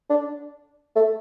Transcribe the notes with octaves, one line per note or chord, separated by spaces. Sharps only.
D4
A3